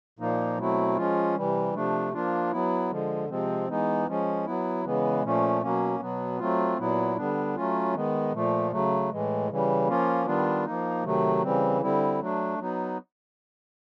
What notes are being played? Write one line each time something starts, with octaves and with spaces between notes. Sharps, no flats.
A#2 F3 A#3 D#4
B2 F#3 A3 C4 E4
F3 G#3 C#4 F4
C3 E3 G3
C3 F3 A3 D4
F3 A#3 D4 F4
F#3 B3 E4
D3 F3 G#3
C3 F3 G#3 C4
E3 G#3 B3 D#4
F3 G#3 C#4
F#3 B3 E4
C#3 E3 G#3 B3
A#2 F3 A3 C#4
B2 F#3 A#3 C#4
B2 F#3 B3
F#3 A3 C4 F4
A#2 F#3 B3 E4
D3 G3 B3 D4
F#3 A3 C#4 F4
D#3 G#3 B3
A#2 F3 A3
C#3 F#3 A3
A2 E3 G#3
C#3 E3 G3
F3 A#3 C#4 F4
D#3 G3 B3 D4 F4
F3 A#3 D#4
C3 D#3 F#3 A3
C#3 E3 G3 C4
D3 G3 C4 E4
F#3 A3 D4
F#3 B3 D#4